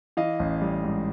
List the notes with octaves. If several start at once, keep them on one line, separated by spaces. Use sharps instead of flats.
E3 D#5 F5
A1
G3
G#2